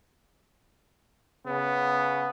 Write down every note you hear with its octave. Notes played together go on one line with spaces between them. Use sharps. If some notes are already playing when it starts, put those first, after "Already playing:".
C#3 B3